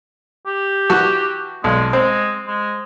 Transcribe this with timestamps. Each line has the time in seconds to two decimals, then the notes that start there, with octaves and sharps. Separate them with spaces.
0.47 G4
0.90 E3 F#4 A5
1.64 B1 G#3
1.93 G#3 C4
2.47 G#3